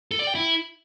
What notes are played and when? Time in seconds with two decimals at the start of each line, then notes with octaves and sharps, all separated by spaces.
0.11 A4
0.19 D5
0.27 G5
0.35 E4